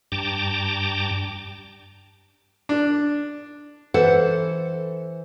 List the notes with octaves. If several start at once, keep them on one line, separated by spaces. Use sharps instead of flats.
G2 G5 A5 A#5 D6
D4
E3 A4 C5 F#5